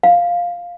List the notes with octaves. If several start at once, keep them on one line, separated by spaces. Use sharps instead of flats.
F5